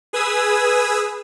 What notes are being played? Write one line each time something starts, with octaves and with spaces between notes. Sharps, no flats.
G#4 B4 G#5 D#6 E6